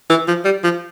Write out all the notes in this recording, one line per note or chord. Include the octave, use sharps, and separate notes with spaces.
E3
F3
G3
F3